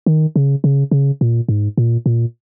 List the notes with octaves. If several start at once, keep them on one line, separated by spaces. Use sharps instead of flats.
D#3
C#3
C#3
C#3
A#2
G#2
A#2
A#2